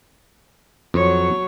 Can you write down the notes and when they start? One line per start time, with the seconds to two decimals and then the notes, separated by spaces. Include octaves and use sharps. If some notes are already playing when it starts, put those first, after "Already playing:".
0.94 F2 F#3 C#5